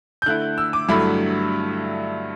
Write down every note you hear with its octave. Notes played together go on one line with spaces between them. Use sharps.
G6
D3 A3 E4 F#6
E6
D6
G2 D3 F#3 A3 E4 B5